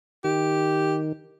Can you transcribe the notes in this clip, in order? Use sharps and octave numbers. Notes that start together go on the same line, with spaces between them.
D#3 G4